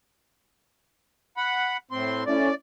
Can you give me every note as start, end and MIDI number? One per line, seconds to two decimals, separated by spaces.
1.37 1.77 78
1.37 1.77 83
1.91 2.24 45
1.91 2.24 60
1.91 2.24 84
2.26 2.49 57
2.26 2.49 61
2.26 2.49 64
2.26 2.55 74